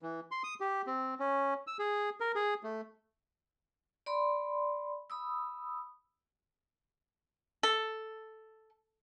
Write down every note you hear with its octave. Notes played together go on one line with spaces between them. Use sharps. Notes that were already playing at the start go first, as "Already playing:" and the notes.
E3
C6
D#6
G4
C4
C#4
E6
G#4
A#4
G#4
A3
D5 B5 C6
B5 D#6 E6
A4